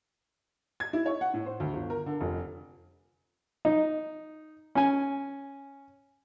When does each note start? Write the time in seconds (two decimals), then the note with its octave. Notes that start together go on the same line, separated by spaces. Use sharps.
0.80 G#6
0.93 E4
1.06 C#5
1.21 F#5
1.34 A2
1.46 C5
1.60 D2
1.74 G1
1.90 A#4
2.06 D3
2.21 F1
3.65 D#4
4.75 C#4 G#5